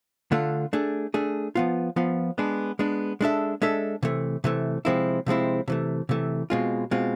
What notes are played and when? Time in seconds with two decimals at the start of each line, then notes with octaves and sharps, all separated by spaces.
0.32 D3 A3 D4 F4
0.73 A3 D4 G#4
1.14 A3 D4 G#4
1.55 F3 B3 F4
1.96 F3 B3 F4
2.38 G#3 B3 D4
2.79 G#3 B3 D4
3.21 G#3 D4 A4 E5
3.62 G#3 D4 A4 E5
4.03 C3 E3 A3
4.44 C3 E3 A3
4.85 C3 F3 G#3 C4 E4
5.26 C3 F3 G#3 C4 E4
5.68 C3 E3 A3
6.09 C3 E3 A3
6.50 B2 G#3 C4 F4
6.91 B2 G#3 C4 F4